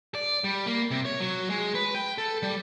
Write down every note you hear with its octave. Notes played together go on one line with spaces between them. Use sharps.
D5
G3
A#3
C3
C#5
F#3
G#3
B4
G5
A4
G3